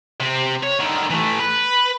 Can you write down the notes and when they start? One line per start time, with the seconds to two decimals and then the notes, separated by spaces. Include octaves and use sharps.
0.20 C3 C4
0.63 C#5
0.80 D3 D#3
1.10 E3 A3
1.39 B4